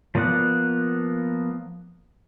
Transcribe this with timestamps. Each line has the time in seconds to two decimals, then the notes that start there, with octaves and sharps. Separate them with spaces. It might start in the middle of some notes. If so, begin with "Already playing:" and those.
0.15 F3 A#3 B3 D5 F#5